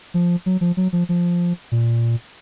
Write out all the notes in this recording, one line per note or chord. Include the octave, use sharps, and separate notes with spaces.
F3
F#3
F3
F#3
F3
F3
A#2